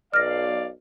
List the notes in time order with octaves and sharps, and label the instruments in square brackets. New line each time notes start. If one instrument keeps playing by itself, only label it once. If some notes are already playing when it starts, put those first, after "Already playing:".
[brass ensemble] B1 D5 F5 [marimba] F6 A#6